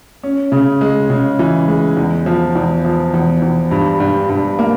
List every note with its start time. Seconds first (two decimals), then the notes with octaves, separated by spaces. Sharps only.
0.23 C#4
0.52 C#3
0.81 G#3
1.10 C#3
1.39 E3
1.68 G#3
1.97 E2
2.26 F3
2.55 E2
2.84 F3
3.14 E2
3.42 E2
3.71 G2
4.00 G2
4.29 G2
4.59 A#3